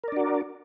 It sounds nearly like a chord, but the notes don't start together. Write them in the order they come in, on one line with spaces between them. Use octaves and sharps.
A#4 D5 D4 F#4